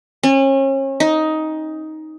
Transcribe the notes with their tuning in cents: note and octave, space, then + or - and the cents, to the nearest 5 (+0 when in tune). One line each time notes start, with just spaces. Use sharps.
C#4 -35
D#4 +10